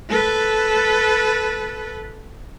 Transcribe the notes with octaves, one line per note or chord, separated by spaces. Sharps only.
A4 B4